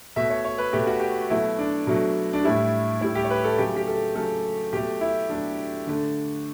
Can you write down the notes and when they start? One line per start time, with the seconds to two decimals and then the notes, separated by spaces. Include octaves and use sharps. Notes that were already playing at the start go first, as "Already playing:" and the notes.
0.16 B2 A3 E5
0.30 C#5
0.44 C#5
0.58 B4
0.73 B2 A3 G4
0.87 F#4
1.00 G4
1.30 B2 F#3 A3 E4
1.59 D4
1.87 B2 F#3 A3
2.33 D4
2.44 A2 G3 E4
3.01 A2 G3 E4
3.15 G4
3.25 C#5
3.30 B4
3.44 A4
3.58 C#3 F#3 A3 G4
3.77 G4
3.87 A4
4.15 C#3 F#3 A3 A4
4.73 B2 F#3 A3 G4
5.01 E4
5.30 B2 F#3 A3 D4
5.87 D3 A3